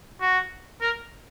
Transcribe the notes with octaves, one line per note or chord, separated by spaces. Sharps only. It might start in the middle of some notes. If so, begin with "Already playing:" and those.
F#4
A#4